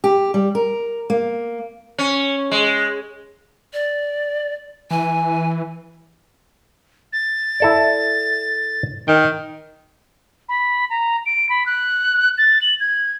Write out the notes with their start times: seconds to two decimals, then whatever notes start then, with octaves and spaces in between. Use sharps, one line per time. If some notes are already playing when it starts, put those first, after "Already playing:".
0.04 G4
0.34 G3
0.55 A#4
1.10 A#3
1.98 C#4
2.51 G#3
3.73 D5
4.91 E3 G#5
7.13 A6
7.60 E4 A4 D5
9.08 D#3 G5
10.49 B5
10.90 A#5
11.26 D7
11.49 B5
11.66 F#6
12.38 A6
12.61 F#7
12.80 G#6